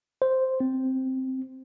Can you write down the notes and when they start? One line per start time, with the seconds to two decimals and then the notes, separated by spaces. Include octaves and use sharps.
0.22 C5
0.60 C4